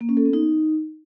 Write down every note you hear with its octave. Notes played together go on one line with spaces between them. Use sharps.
A#3
C#4
A4
B3
D#4